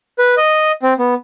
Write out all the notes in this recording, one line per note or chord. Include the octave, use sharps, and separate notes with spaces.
B4
D#5
C4
B3